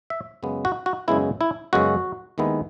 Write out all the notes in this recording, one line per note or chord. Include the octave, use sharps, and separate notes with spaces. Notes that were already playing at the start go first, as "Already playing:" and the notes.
E5
F#2 C#3 G#3 B3
F#4
F#4
F#2 C#3 G#3 B3 E4
E4
F#2 C#3 G#3 B3 F#4
D#2 D#3 G#3 B3 E4